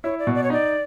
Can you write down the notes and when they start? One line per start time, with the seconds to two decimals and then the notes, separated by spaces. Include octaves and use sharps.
0.04 E4 C#5
0.19 D5
0.27 B2
0.34 D5
0.43 C#5
0.50 D#4 D5